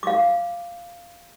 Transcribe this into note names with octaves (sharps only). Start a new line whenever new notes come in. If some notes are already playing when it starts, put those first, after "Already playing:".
F5 D6